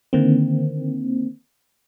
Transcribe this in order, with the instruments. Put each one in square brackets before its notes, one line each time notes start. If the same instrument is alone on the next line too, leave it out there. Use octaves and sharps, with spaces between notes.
[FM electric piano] D3 D#3 A#3 C4